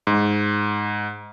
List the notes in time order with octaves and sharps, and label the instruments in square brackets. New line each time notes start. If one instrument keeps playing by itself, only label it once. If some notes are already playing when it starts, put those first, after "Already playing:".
[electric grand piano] G#2